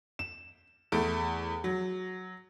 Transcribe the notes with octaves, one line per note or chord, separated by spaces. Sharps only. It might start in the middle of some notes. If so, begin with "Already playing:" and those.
E7
E2 A3 D7
F#3